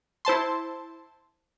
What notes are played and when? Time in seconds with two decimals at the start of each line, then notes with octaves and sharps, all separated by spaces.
0.25 E4 C5 A5 C6